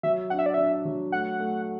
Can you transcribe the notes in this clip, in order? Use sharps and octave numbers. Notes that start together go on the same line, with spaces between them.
F#3 E5
D4 F#5
E5
D5
D4 E5
F#3
A3 F#5
A3